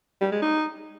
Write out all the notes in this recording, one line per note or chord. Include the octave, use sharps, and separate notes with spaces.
G3
G#3
D#4